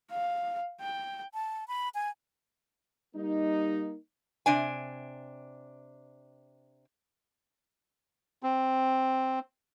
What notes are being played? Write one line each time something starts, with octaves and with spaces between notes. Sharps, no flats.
F5
G5
A5
B5
G#5
G3 A#3 D#4
C3 D4 G#5
C4